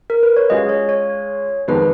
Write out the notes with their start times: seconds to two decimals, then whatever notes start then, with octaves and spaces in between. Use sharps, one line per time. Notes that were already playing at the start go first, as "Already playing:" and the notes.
0.10 A#4
0.23 B4
0.37 C#5
0.50 G#3 C#4 F4 G#4 D#5
0.69 C#5
0.89 C#5
1.68 F2 D#3 G#3 B3 B4